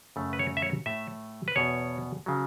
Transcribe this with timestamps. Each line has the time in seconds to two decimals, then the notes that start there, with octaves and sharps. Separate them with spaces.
0.16 F#2 C#3 A3
0.33 B4
0.39 C#5
0.57 E5
0.62 C#5
0.86 A2 A3 E5
1.48 B4
1.56 E2 B2 B3 C#5
2.26 C#3 F#3